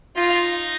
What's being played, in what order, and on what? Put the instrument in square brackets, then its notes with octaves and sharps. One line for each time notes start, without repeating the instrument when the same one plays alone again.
[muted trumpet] D#4 [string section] F4